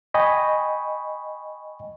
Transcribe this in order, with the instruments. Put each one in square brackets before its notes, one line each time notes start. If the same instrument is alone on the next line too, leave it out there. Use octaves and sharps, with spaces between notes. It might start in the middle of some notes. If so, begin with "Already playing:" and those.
[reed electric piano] D#5 G5 G#5 B5 C#6